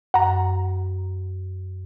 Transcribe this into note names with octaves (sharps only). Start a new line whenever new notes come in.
F#2 F#5 A#5